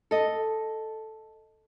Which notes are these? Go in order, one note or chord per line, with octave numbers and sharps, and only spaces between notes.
A4 D#5